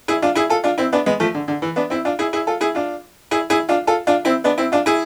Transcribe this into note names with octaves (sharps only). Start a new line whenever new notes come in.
E4 G#4
D4 F4
E4 G#4
F4 A4
D4 F4
C4 E4
B3 D4
G#3 B3
F3 A3
D3
D3
E3
B3 D4
C4 E4
D4 F4
E4 G#4
E4 G#4
F4 A4
E4 G#4
D4 F4
E4 G#4
E4 G#4
D4 F4
F4 A4
D4 F4
C4 E4
B3 D4
C4 E4
D4 F4
E4 G#4